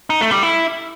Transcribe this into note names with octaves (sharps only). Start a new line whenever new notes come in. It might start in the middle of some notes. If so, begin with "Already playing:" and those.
D#4
A3
G3
E4